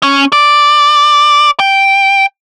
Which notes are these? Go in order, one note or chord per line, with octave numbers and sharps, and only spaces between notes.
C#4
D5
G5